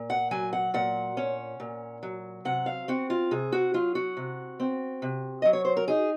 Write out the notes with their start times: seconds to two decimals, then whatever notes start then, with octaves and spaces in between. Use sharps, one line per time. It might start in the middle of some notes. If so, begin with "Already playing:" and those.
Already playing: A#2
0.10 F#5
0.31 F#3 G#5
0.53 F#5
0.74 A#2 F#5
1.17 C#4
1.60 A#2
2.03 F#3
2.45 C3 F#5
2.66 F5
2.88 C4 F#4
3.10 F4
3.31 C3 G#4
3.52 F#4
3.74 F#3 F4
3.95 F#4
4.17 C3
4.60 C4
5.02 C3
5.42 F#3 D#5
5.53 C#5
5.65 C5
5.77 A#4
5.88 D#4 G#4